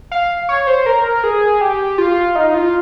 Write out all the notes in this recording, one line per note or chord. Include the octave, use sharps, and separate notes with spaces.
F5
C#5
C5
A#4
G#4
G4
F4
D#4
F4